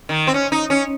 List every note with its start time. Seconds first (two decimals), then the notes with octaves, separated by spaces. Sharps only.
0.09 D#3
0.27 C4
0.34 C#4
0.52 D#4
0.70 C#4